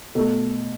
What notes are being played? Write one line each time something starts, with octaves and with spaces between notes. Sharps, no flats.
B2 A3 A4